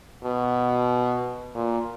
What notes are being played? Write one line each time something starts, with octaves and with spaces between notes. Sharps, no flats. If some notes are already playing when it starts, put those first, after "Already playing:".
B2
A#2